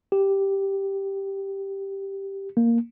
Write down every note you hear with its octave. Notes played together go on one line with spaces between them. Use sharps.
G4
A#3